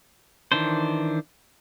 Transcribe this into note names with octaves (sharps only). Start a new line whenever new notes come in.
D#3 E3 D4 C5